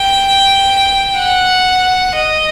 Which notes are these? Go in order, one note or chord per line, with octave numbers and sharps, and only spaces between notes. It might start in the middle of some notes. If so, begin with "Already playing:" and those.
Already playing: G5
F#5
D#5